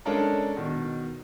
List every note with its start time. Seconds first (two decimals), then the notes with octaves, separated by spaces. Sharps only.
0.05 G#3 C#4 D4 A4 A#4
0.57 B2 D#3